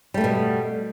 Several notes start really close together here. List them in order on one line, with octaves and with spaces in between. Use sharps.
G3 A3 B3 B2